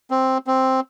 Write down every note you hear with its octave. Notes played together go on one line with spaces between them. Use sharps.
C4
C4